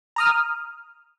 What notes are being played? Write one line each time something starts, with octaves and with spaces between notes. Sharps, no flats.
A#5 D#6 F6